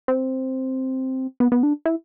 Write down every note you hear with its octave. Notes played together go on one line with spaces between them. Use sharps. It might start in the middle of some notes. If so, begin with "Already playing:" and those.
C4
B3
B3
D4
E4